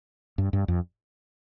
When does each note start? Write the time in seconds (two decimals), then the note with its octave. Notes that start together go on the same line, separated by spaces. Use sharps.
0.38 G2
0.53 G2
0.68 F2